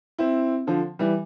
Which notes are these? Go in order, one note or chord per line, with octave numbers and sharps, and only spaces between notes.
C4 E4
D3 F3
E3 G3